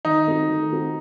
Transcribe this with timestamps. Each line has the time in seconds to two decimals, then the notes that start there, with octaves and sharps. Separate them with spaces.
0.05 D#3 D#4
0.27 A3 C4 F#4
0.49 D#3
0.72 A3 C4 F#4